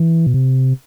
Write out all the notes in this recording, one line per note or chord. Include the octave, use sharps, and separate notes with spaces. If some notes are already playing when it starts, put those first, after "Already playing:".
Already playing: E3
B2
C3